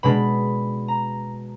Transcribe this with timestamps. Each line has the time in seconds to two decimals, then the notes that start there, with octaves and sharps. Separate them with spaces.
0.03 B2 G#3 D4 B5
0.88 A#5